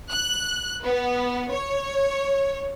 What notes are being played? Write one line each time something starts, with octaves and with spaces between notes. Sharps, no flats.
F#6
B3
C#5